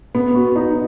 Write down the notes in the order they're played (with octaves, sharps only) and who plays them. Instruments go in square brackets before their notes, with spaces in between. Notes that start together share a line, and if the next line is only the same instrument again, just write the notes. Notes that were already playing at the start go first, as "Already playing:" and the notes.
[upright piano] B3
F#4
D#4